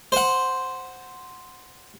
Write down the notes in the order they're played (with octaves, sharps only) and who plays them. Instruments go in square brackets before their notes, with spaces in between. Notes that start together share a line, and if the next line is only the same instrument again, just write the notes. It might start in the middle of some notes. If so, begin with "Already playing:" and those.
[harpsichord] C5 F#5